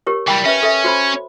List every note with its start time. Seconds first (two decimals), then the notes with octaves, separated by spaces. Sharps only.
0.07 G4 A#4 C#5
0.28 E3 G3 G5 B5
0.46 C#4 B4 C#5 E5
0.63 A4 E5
0.84 F#4 C5 B5